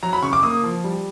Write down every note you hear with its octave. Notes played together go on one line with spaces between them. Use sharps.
F#3 A#5
B5
C#3 C#6
D6
A#3 D#6
F3
G3